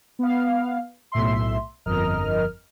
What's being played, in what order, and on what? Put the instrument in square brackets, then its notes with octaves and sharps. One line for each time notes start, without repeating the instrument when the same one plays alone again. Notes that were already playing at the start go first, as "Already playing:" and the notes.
[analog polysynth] B3 F5
B1 A2 E5 C6
G1 F2 A#4 D#5 F6